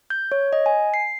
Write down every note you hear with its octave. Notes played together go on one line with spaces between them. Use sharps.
G6
C#5
D#5
G#5
C7